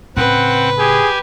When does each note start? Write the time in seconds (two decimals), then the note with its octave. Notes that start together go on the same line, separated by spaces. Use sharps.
0.16 A2 C#3 C4 B4 F#5
0.79 G4 G#4 G#5